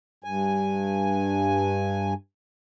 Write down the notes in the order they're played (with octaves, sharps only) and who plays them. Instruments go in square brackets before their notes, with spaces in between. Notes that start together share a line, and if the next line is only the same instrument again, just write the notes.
[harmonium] G2 G#5